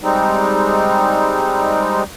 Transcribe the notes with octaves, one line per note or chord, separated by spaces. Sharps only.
G3 G#3 C4 D#4